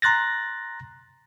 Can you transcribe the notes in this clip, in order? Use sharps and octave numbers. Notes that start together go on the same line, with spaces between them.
A#5 C6 F#6 A6 A#6